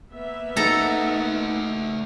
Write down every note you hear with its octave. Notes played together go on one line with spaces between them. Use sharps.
A#3 B3 E5
A3 D#4 A4 F#5 A#5